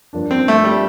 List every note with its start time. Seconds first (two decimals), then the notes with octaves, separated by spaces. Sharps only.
0.13 G2 F3 A#3 D4
0.31 C4
0.48 A3
0.64 G3